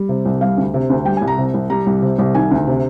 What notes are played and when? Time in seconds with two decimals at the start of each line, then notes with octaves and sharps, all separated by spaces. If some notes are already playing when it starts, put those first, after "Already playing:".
Already playing: G3
0.09 C3
0.25 C2
0.41 G3 F5
0.57 D2
0.74 C3
0.90 D2
1.05 G3 G5
1.17 G#5
1.21 C2
1.27 A#5
1.38 C3
1.54 C2
1.70 G3 A#5
1.86 C2
2.02 C3
2.18 C2
2.35 D#3 G#5
2.51 D2
2.67 C3